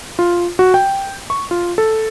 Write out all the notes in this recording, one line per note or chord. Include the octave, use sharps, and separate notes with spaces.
F4
F#4
G5
C#6
F4
A4